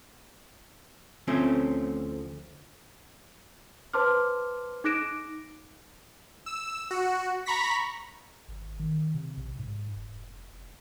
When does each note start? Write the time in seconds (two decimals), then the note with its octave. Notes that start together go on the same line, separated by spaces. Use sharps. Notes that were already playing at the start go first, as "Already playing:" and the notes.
1.28 D2 F3 A3 C4 C#4
3.93 B4 C5 A5 C6 D6 F6
4.84 D#4 D6 F#6 A#6 D7 E7
6.46 E6
6.91 F#4
7.46 A#5 B5 C#6 A#6 B6
8.49 G#1
8.79 D#3
9.14 C3
9.37 A#1
9.58 G#2
9.96 F1